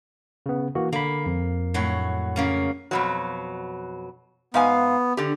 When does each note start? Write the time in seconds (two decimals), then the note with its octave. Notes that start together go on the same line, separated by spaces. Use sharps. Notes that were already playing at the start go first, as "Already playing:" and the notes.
0.46 C#3 B3
0.75 E3 A#3 F#4
0.93 D3 A#3 B5
1.26 F2
1.74 A2 F#3 F#4
2.36 C#3 A#3 C#4
2.91 F2 B2 F#3
4.54 G#2 B3 F5 G#5
5.17 D3 G4